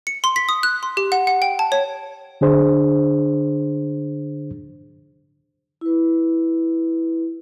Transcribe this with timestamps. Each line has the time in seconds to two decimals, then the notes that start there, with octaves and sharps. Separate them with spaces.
0.07 C#7
0.24 C6
0.36 B6
0.49 D#6
0.63 F#6
0.83 C6
0.97 G4
1.12 F#5
1.27 F#5
1.42 G5
1.59 A5
1.72 C#5
2.41 D3 D4 G#4 C5
5.81 E4 B4